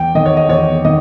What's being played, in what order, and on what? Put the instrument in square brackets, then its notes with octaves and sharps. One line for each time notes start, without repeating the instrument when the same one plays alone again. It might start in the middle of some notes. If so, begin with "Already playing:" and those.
Already playing: [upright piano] E2 G5
D#3 D#5
C#5
D#5
E2 C#5
D#3 D#5